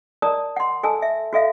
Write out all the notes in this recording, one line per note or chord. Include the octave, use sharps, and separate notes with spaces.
A#4 D5 A5 A#5 D#6
F#5 C6
A4 G#5 A5 E6
E5
F#4 A4 E5 F5